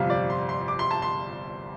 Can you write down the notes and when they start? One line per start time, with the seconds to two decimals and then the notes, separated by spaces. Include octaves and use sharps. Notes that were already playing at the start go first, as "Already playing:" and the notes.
Already playing: G1 F2 C3 F5
0.10 D5
0.30 C6
0.49 C6
0.68 D6
0.79 C6
0.91 A5
1.02 C6